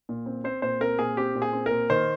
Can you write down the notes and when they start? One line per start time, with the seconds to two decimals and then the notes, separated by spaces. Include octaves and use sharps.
0.09 A#2
0.26 C4
0.44 C4 C5
0.62 A#2 C5
0.80 C4 A#4
0.99 A#2 G#4
1.17 C4 G4
1.35 A#2
1.42 G#4
1.53 C4
1.66 A#2 A#4
1.90 D#3 C5